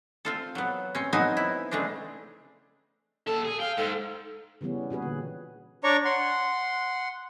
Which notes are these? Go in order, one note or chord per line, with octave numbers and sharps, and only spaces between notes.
C4 F4 A4
F#3 B3
C4 C#4
F#3 B3 C4 D#4 C5 G#5
E4
C#3 G#3 A3 C4 D4
A#2 A4 A5
G#4
F5 G5
G#2 A4
C#3 E3 G3 B3 C#4
A#2 F#4 G#4 B4
D3
D4 C#5 D5 A#5 C#6
F#5 C6